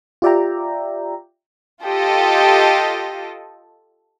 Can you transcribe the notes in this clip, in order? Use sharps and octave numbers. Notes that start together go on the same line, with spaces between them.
F4 G4 D5 E5 G5 A#5
F4 G4 A4 D#5